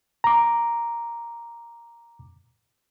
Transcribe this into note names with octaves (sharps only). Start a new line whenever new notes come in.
A#5 D6